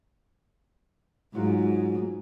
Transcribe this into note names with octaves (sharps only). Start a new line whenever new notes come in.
G#2 F#3 F4 F#4